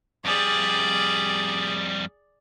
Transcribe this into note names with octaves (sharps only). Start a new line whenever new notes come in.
F2 G3 G#4 D5